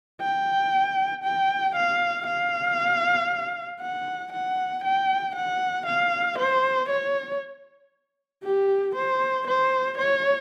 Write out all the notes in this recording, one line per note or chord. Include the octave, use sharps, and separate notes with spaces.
G5
G5
F5
F5
F#5
F#5
G5
F#5
F5
C5
C#5
G4
C5
C5
C#5